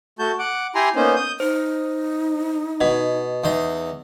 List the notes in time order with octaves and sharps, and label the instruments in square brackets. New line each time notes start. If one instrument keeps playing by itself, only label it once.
[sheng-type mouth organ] A3 F#4 A5 G6
F#5 D6
E4 G4 G#5 A#5 C6
A#3 B3 C#4 D#4 C5
D#6 G6
[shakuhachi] D#4 [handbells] C5
[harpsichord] B2 [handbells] D#5 F#5
[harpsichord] E2 D#4